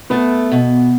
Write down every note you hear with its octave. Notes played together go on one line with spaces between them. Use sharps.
A3 B3
B2